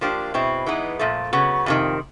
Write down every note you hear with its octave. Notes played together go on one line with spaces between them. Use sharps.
F3 A#3 D4 G4 C5
B2 G#3 C4 E4
E3 G#3 B3 D#4
A#2 F3 A3
C#3 F#3 B3
F2 C3 D#3